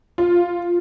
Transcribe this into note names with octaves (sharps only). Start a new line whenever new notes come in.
F4